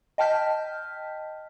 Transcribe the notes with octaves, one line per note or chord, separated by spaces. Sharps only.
D#5 G5 A5 F6 G6 B6